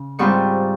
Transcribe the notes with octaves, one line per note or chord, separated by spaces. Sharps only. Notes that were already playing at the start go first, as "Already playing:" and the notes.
Already playing: C#3
G#2 G3 C4 F4 C#6